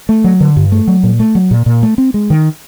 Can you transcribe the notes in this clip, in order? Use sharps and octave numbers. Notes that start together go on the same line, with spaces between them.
A3
F#3
D3
G2
A3
F#3
A#2
A3
F#3
A#2
A#2
A3
C4
G#3
D#3